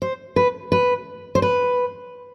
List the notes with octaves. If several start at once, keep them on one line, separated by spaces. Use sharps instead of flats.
C5
B4
B4
C5
B4